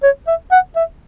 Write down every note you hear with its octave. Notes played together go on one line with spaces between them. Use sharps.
C#5
E5
F#5
E5